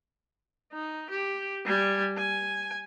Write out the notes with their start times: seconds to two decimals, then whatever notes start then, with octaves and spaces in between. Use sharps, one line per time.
0.72 D#4
1.10 G4
1.64 G3 G#5
2.17 G#5